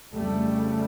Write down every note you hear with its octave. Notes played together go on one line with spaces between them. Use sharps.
F2 C#3 G3 A3